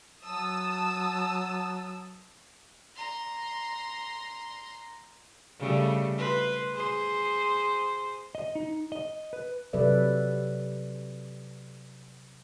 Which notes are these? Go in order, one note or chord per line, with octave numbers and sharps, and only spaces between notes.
F#3 A5 D#6 E6
A#5 C6
C#3 G3 A3
B4 C5
G#4 C5
D#5
D#4
D#5
B4
C3 F#3 A4 B4 D5 E5